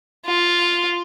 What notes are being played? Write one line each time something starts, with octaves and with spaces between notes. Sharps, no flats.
F4